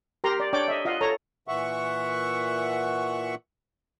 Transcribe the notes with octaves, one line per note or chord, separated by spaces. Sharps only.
G4 A#4 A#5 C6
D5
D4 C#5 D5 G5 D6
D#5 E5
F4 D#5 F5 F#5
A4 C#5 A#5
A#2 E3 E5 F#5 C#6